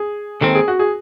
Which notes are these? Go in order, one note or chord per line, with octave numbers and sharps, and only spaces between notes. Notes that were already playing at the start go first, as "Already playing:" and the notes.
Already playing: G#4
D#2 D#3 G#3 C4 A4
G#4
F#4
G#4